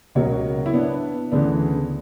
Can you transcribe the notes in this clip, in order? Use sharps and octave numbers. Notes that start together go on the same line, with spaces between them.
C#2 B2 F#3 A#4 C#5
E4
B3 D4
D2 C#3 E3 B3 D4